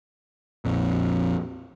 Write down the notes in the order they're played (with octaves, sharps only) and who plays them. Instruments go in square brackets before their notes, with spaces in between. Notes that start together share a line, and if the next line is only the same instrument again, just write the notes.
[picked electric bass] A#1 F2